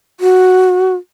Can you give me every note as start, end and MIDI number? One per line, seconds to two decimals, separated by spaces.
0.20 0.95 66